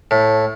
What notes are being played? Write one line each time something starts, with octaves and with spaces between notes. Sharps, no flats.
A2